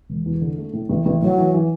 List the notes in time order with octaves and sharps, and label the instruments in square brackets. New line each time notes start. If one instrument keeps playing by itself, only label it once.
[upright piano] E1
E2
D3
A3
A2
A1
A1
[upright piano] A2 [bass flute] F#3
[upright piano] E3
E3